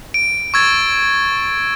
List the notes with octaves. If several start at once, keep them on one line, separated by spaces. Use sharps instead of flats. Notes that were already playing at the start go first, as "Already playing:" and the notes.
D7
C#6 E6 G#6 A6